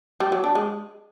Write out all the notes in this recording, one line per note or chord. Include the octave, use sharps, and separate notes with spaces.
G3
F#3
D4
G#3